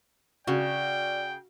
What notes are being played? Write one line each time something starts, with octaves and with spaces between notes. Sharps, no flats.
C#3 F#4 D5 G5